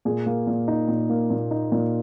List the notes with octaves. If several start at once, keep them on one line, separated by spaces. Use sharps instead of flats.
A#2 G#4
A#3
A#2
D#4
A#2
A#3
A#2
D#4
A#2